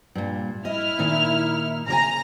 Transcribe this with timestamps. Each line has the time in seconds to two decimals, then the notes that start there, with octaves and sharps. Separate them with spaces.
0.15 G2 A#2
0.65 E4 D#5 F6
0.99 A#2 D#3 D#4
1.88 C#3 D5 G#5 A#5